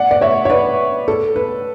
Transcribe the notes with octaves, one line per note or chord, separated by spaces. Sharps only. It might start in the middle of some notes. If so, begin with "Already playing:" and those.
Already playing: D5 F#5
D5
C#5 E5
C#5
B4 D5
A4
B4